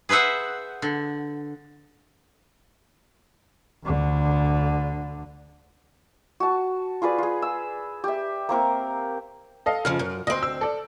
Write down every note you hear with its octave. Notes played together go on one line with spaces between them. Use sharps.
G#4 B4 C5 E5 F#5
D3
D2 D3
F#4 A5
F4 G#4 B4 D5
F4 G#4
E6
G4 E5
A#3 C4 A#4 C#6
A4 D#5 F5
F2 C#3 F3 F6
F#2
D2 C4 D#5 C6
E6
A4 D5